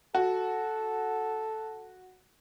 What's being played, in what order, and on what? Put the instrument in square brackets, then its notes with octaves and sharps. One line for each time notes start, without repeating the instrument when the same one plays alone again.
[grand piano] F#4 [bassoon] A4